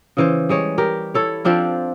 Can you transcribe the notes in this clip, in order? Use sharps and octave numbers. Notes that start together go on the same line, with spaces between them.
C#3 E3 C5
G3 G#3 C#5
G4 A#4
E4 A4 C#5
F3 C4 D4 F4